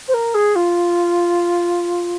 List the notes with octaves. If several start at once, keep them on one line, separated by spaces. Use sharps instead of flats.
C5
A#4
G#4
F4